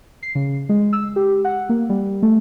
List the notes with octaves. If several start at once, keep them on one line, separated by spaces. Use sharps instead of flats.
C7
C#3
G#3
E6
G4
F#5
A#3
G3
A3